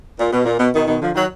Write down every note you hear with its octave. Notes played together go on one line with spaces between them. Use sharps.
A#2
B2
A#2
B2
B2 D#3
B2 D#3
D3 F3
D#3 F#3